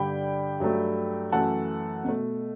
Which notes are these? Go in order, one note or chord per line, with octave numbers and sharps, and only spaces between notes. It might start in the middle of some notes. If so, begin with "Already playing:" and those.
Already playing: G2 D3 G3 G5 B5
G2 F#3 A3
F#2 E3 A3 F#5 A5
B2 A3